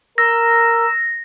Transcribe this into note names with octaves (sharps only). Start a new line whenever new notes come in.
A#4 E6 A#6